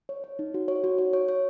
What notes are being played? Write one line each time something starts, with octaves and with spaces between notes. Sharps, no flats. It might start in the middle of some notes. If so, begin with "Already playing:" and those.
C#5
C#5
D#4
F#4
C#5
F#4
C#5
C#5
C#5